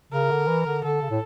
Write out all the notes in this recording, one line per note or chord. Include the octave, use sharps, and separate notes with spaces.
C#3 A#4
D3
E3
D3
D3 A4
C#3
A2